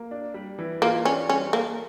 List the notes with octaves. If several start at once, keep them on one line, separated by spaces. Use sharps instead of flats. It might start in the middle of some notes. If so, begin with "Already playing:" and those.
Already playing: A#3
D4
G3
E3
A#3 F4
C#4 D4
G3 C#4
A#3 A4